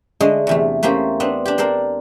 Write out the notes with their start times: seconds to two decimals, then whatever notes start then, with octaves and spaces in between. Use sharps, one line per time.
0.21 D3 G#3 A3 D#5
0.47 E2 C3 A3
0.83 A3 A#3 C4 C#4 G4
1.20 B3 C4 D4
1.45 D4 G4
1.58 D4 A4 A#4 C5 D5